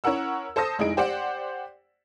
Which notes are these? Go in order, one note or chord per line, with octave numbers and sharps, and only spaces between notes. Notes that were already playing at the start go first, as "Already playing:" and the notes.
C#4 E4 A#4 F#5 E6
A4 C5 A5 D#6 A#6
F1 G#3 D#4 E4 G#4 D7
G4 C5 D5 F#5